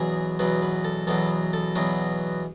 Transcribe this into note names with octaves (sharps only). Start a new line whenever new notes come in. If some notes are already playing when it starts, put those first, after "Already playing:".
Already playing: E2 B2 F#3 G#4
E2 B2 F#3 B4
B4
A4
E2 B2 F#3 A4
A4
E2 B2 F#3 B4